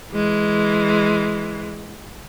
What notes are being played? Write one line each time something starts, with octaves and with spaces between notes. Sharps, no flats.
E3 G#3